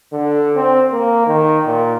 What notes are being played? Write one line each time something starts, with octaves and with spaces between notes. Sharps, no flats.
D3
C4
A#3
D#3
A#2